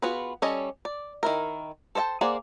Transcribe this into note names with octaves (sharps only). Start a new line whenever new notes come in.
B3 F4 F#4 G#4 B4
G3 C#4 A4 C#5 D#5
D5
D#3 E4 A#4
A4 C5 D5 G5 A5
A#3 G#4 C5 D5 F#5